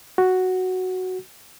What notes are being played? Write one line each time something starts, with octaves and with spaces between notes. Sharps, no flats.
F#4